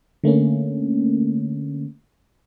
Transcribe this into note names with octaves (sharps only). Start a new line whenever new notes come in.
D3 A3 A#3 C#4